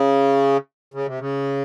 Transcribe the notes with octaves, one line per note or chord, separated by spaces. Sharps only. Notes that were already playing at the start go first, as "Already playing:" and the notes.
Already playing: C#3
C#3
C3
C#3